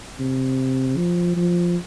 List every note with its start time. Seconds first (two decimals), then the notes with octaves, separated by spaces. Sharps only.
0.19 C3
0.96 F3
1.36 F3